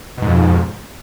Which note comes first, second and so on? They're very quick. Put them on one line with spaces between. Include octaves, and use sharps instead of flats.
B2 G#2 F2